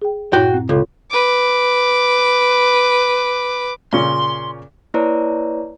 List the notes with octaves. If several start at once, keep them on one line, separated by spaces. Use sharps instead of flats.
G#4 G5
G2 A#2 E4 F#4 G5
C4
C#2 F4 A4 C#5
B4 D6
A#2 C#3 C#4 C6
A#3 E4 B4 C#5 D5 A#5